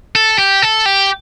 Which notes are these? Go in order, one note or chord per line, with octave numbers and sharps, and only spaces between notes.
A4
G4
A4
G4